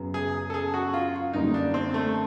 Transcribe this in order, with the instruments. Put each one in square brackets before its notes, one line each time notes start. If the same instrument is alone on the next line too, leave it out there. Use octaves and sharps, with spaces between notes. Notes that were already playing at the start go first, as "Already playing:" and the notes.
Already playing: [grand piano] F#2 C#3 F#3 B3
[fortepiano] G#4
A4
G#4
F#4
F4
[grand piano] F#2 D3 G3 A#3 [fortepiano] D#4
[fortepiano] D4
C4
A3